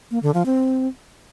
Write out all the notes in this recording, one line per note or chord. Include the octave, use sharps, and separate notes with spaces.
A#3
D3
F3
C4